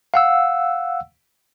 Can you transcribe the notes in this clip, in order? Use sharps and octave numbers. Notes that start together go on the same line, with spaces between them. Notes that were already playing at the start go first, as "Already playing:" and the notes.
F5 F#5 E6